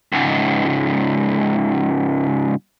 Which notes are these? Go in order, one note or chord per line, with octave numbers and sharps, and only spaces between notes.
C#2 G#2